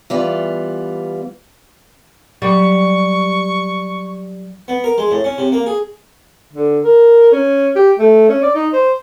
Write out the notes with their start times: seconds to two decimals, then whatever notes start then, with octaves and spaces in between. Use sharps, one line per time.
0.10 E3 G3 B3 F4
2.42 F#3 G3 C#6
4.68 B3
4.84 A#4
4.98 G#3
5.11 A2
5.24 C#4
5.38 C3
5.52 A#3
5.66 G#4
6.53 D3
6.84 A#4
7.32 C#4
7.76 G4
7.99 A3
8.29 C#4
8.43 D5
8.55 D#4
8.73 C5